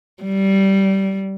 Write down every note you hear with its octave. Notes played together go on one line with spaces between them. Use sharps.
G3